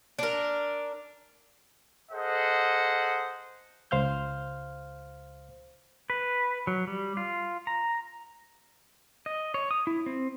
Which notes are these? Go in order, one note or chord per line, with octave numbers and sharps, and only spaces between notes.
D4 A#4
G#4 A4 C5 D#5 F#5
C#2 C5 F5 F6 G6
B4
F#3
G3
F4
A#5
D#5
C#5
D#6
E4
C4